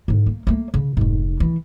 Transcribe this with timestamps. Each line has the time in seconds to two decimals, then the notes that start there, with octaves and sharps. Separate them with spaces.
0.08 G#2 D3
0.26 A#3
0.47 A3 A#3
0.74 C#3
0.97 F1 G#2
1.40 E3